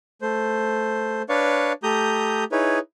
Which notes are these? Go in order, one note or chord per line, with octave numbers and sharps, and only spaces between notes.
A3 C5
D4 B4 C#5 D5 F5 C#6
A3 G4 A#5 D#6 G6
D#4 E4 G#4 B4 C#5